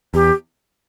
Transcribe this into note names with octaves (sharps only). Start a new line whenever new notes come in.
E2 G4